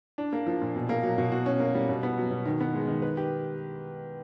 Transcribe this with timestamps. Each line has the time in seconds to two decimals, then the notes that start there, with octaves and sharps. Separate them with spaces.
0.18 D4
0.33 A#3
0.47 F3
0.62 A#2
0.76 B2
0.89 A#3
1.03 F#3
1.18 B2
1.32 F#4
1.46 C#4
1.60 A#3
1.75 G3
1.89 B2
2.03 B3
2.17 F#3
2.31 B2
2.45 D#3
2.60 B3
2.74 G#3
2.88 D#3
3.02 B4
3.17 G4